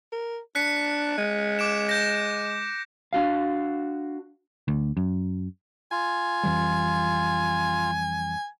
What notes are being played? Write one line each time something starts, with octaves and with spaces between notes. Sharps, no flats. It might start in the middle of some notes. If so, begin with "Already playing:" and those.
A#4
D4 F#6 B6 C#7
G#3
D6 D7 E7
G6 A#6
D4 F#4 F5
D2
F#2
F4 G#5
F2 E3 G3